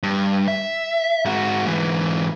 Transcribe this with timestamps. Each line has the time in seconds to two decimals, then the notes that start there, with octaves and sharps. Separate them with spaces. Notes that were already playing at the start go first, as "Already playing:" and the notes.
0.03 G2
0.48 E5
1.25 G#2 F#4
1.66 G#2 E3